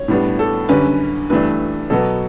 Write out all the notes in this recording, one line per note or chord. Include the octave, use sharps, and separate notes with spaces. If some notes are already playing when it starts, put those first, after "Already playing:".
Already playing: C#5
A2 G3 B3 D4
A4
F#2 D3 G3 C#4 B4
G2 E3 A3 D4 B4
B2 F#3 B3 A4